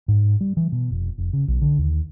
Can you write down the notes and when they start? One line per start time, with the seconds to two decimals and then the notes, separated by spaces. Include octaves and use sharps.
0.08 G#2
0.41 G3
0.57 E3
0.72 B2
0.91 F1
1.18 F1
1.33 C#3
1.48 B1
1.61 D3
1.78 D#2